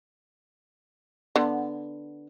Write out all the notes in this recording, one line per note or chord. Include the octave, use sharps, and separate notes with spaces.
D3 B3